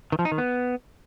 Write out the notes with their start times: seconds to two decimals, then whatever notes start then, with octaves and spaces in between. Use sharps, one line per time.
0.12 D#3
0.19 F3
0.25 D#4
0.32 D#3
0.38 B3